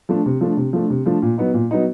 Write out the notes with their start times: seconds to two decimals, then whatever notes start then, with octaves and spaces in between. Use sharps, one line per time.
0.09 F3 A3 D4
0.26 C3
0.41 F3 A3 D4
0.57 C3
0.73 F3 A3 D4
0.90 C3
1.06 F3 A3 D4
1.22 A#2
1.38 F#3 B3 D#4
1.54 A#2
1.71 F#3 B3 D#4